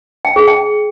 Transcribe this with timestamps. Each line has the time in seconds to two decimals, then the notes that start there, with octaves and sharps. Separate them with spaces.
0.25 G5
0.36 G#4
0.48 G5